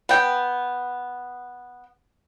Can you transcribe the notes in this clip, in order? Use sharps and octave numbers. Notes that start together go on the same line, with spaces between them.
B3 G5